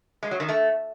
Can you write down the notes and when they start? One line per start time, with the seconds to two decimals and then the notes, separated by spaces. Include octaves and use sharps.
0.23 G#3
0.31 F#3
0.40 D#3
0.49 A3